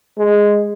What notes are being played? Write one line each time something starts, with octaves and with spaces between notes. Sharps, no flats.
G#3